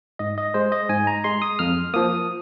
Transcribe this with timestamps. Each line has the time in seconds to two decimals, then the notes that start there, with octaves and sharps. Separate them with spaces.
0.19 G#2 D#5
0.38 D#5
0.54 G#3 C5
0.72 D#5
0.89 G#2 G#5
1.07 A#5
1.24 G#3 C6
1.42 D#6
1.59 F2 F6
1.94 F3 A#3 D#6